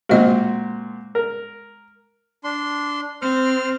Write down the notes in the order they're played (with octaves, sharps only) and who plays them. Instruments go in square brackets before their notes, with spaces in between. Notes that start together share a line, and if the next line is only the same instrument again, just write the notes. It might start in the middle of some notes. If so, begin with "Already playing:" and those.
[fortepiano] A#2 C4 F#4 [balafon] G#3 D#5
[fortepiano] A#4
[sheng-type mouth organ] D4 C6
[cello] C4 [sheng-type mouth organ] C5 F6